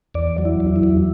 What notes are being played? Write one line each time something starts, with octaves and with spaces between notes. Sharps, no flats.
E2 D5
F#3
E4
E2
E4
E2